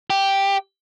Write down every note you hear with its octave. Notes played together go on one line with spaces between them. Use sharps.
G4